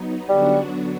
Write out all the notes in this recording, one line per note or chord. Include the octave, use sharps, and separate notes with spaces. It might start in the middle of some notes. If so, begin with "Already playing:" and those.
Already playing: F#3 B3 D#4
D3 F#3 G3 B3 D4 F#4